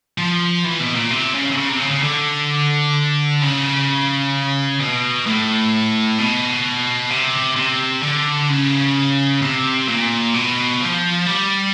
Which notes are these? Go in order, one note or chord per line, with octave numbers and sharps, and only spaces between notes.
F3
E3
B2
A#2
C3
C#3
C3
C#3
C3
C#3
C#3
D3
C#3
B2
A2
B2
C3
C3
D3
C#3
C3
A#2
B2
F3
G3